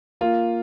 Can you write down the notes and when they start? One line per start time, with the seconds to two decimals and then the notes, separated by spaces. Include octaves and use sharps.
0.21 A#3 F4